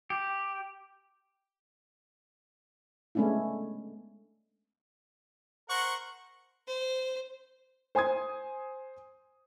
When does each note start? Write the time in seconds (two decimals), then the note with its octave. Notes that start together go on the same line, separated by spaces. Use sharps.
0.10 G4
3.15 G#3 A3 B3 C#4 D4 E4
5.69 A#4 C5 F#5 C#6
6.68 C5
7.95 C5 G#5 C6 D#6 G#6